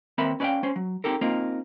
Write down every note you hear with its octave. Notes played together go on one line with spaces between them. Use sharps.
D#2 C4 A#4 B4 E5 B5
C#4 B4 D5 D#5 F5 G5
C#4 C5
F#3
C4 D#4 G4 A4 A#4
A#3 C4 D#4 F4 A#4